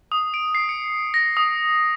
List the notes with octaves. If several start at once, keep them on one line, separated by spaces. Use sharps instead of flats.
D#6
D7
C7
C#7
A#6
D#6